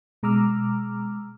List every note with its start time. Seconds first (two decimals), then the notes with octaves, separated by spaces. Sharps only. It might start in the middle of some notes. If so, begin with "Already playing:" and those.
0.23 B2 G#3 A#5 D6 E6 F6